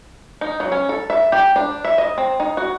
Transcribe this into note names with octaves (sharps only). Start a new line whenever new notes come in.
D#4
F#3
C#4
A4
E5
G4
D4
E5
D#5
C4
D#4
F#4